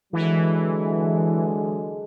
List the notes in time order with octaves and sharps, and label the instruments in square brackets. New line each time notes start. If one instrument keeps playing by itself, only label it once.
[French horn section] D3 F#3 G#3 [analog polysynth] E3